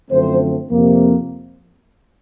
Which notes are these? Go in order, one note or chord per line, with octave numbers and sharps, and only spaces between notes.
F#2 D3 F3 A3 C4 C5
F2 C3 F3 A#3